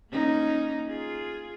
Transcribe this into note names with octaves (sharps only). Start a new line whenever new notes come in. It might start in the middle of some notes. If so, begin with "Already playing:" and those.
A#3 C#4 D#4
F4 G#4